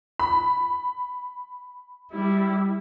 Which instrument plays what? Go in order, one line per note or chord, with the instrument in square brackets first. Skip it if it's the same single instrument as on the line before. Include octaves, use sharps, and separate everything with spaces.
[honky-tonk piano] B5
[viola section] G3 E4